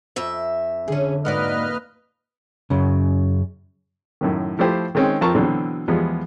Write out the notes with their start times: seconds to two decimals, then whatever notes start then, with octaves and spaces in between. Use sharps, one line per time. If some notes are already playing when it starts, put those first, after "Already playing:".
0.16 F2 E5
0.88 D3 C#4 G#4
1.25 G#2 A#3 F#4 B4 D5 D#5 F6
2.70 F#2 C#3
4.21 F#2 A2 D#3
4.59 F3 A3 E4 G4 C5
4.95 D#3 G#3 C4 C#4
5.21 F2 C4 F4 A#4 A5 C#6
5.35 B2 D3 E3 F#3 C4
5.88 E2 F3 G3 G#3 B3